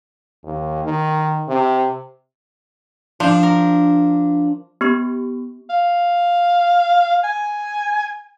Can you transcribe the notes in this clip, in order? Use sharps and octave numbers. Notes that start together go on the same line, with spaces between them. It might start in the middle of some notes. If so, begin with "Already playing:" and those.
D#2
D#3
C3
F3 D4
A#4
B3 G4 C#6
F5
G#5